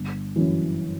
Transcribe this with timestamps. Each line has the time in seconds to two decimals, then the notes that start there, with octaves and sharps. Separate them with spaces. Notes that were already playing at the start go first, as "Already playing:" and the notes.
Already playing: G1
0.36 F#2 E3